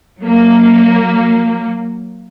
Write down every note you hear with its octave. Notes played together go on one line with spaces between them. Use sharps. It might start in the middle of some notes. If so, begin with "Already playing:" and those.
F#3 A#3